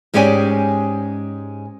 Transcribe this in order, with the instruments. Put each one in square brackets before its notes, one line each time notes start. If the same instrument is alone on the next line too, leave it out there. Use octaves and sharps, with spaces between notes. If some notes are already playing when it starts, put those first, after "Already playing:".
[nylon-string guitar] G#2 G#3 C#4 G4 D5 G#5